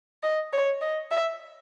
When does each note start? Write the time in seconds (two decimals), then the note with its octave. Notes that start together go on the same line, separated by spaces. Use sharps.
0.23 D#5
0.52 C#5
0.81 D#5
1.11 E5